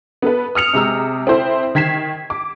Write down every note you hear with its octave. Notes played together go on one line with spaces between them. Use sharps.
B3 A4 B4
D#6 F6 C#7 F7
C3 G#3 A#5 E6
C4 E4 A4 C5
D#3 G#6 B6 C7 E7
D6